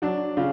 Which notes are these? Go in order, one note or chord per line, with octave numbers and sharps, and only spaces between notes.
F#3 D4
C#3 F4